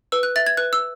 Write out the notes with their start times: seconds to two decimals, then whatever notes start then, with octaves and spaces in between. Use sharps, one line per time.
0.12 B4 E6
0.23 F#6
0.36 E5 A6
0.46 G#6
0.57 B4 F#6
0.73 E6